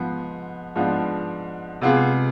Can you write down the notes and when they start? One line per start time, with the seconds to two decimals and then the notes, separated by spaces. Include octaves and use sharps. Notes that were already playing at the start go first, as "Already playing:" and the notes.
Already playing: G#2 F3 B3
0.76 G#2 F3 B3 D4 F4
1.81 C3 G#3 B3 F4 G#4